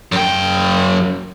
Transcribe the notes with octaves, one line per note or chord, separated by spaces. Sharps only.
F#2 G5